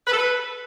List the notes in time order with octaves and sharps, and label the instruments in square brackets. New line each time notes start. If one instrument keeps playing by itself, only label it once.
[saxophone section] B4
A4
B4